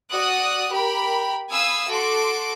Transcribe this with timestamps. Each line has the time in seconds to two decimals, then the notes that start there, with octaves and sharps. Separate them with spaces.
0.10 F#4 D5 D#6 F#6
0.70 G4 A#4 B5
1.50 F5 G#5 B5 D#6 E6
1.89 F#4 A4 C6 D6